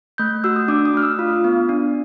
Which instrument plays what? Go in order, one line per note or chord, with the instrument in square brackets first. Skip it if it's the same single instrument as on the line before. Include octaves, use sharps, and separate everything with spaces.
[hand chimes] A3 G6
F#4 E6
D#6
D4 D6
D#6
A3 F6
E6
F4
B3
D4